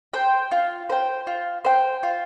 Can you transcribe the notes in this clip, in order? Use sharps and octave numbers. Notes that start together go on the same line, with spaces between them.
C5 G5
F4
C5 G5
F4
C5 G5
F4